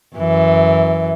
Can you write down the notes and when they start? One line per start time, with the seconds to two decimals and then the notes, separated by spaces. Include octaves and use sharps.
0.16 F#2 E3